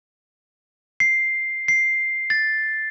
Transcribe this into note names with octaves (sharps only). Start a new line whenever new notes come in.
C7
C7
A6